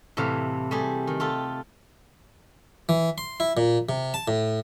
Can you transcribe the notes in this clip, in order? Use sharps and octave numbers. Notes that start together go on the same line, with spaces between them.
A2 C3 E3 E4 F5
G3 A3 G4 G#4
D#3
F4 G4 A4
E3
C6
E4
A#2
C3
A5
A2